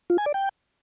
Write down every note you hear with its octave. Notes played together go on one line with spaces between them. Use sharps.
F4
G#5
D5
G5